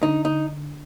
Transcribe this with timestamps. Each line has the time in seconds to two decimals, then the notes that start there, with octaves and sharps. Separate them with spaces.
0.03 D3 D#4
0.25 D#4